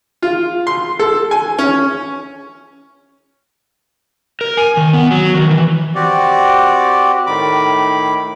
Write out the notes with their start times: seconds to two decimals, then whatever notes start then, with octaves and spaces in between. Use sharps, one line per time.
0.22 F4
0.67 C6
0.99 A4
1.31 G#5
1.59 C#4
4.41 A#4
4.57 G#5
4.77 D#3
4.93 B3
5.11 F#3
5.35 D#3
5.51 E3
5.95 C4 F#4 G4 D5
7.26 A2 D#3 B5 D6